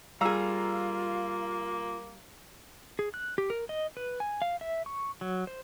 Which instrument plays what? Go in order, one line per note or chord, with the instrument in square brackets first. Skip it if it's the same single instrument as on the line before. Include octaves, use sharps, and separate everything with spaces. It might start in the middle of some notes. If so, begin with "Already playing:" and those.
[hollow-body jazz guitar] G3 G#4 [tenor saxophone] A#3 [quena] F4 [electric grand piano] F5 A#5 E6
[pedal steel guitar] G#4
F#6
G4
A#4
D#5
B4
G#5
F5
E5
C#6
F#3
C5